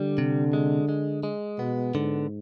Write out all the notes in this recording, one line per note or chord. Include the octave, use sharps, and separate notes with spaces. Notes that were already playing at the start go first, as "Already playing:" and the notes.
Already playing: D3 G3
C3
G#3
G#3
G#3
B2 B3
G#2 D3